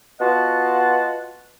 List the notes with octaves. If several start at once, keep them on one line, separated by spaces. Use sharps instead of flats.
B3 F4 F#4 D#5 F#5 A5